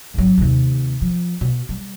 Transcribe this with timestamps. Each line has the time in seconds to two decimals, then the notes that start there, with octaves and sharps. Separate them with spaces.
0.14 G#1 F#3
0.38 D#2 C3
1.02 F3
1.41 B2
1.69 G3